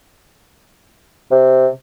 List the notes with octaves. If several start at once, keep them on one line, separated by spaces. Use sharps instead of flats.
C3